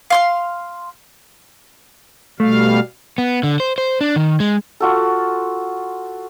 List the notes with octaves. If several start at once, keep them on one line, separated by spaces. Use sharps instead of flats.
F5 C6 F6
B2 G3 A3 F5
B3
D3
C5
C5
D4
D#3
G#3
F4 F#4 A4